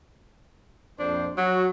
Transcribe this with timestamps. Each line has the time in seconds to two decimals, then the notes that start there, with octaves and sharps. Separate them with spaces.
0.99 A#1 F2 D4 C5
1.37 F#3 F#4